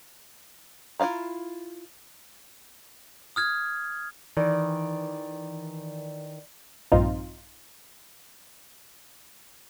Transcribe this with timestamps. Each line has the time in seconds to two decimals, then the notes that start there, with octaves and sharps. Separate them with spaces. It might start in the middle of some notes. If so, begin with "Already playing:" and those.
1.00 E4 F4 D5 F5 A#5
3.36 D#6 F6 G#6
4.37 D#3 E3 D5
6.92 A#1 G2 C4 D#4 F4